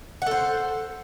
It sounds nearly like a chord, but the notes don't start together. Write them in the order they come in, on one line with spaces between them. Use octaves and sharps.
F#5 A4 C5